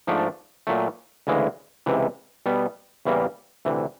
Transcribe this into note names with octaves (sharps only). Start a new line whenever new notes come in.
G#2 F3 A3 D4
A#2 F#3 A3
D2 C#3 E3 G#3
C#2 C3 E3
B2 G3 B3
E2 C#3 E3 G3 A#3
D2 C3 E3